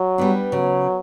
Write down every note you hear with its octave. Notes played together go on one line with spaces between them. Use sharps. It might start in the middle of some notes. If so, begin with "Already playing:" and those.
Already playing: F#3
G3 B3 D4
C#3 F#3